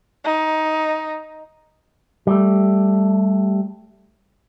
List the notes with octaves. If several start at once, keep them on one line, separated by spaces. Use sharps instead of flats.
D#4
G3 A3